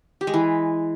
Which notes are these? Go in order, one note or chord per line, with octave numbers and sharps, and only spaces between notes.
G4
G#3
E3